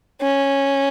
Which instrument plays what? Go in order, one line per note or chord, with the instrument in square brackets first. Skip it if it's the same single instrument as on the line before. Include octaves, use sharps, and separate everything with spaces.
[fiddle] C#4